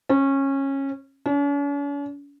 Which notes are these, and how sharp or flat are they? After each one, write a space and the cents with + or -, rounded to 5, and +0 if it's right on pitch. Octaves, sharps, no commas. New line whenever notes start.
C#4 -20
C#4 +45